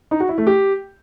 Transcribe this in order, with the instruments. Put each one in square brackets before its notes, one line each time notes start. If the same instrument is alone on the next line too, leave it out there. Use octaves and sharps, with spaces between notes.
[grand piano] D#4
F#4
E4
A3
G4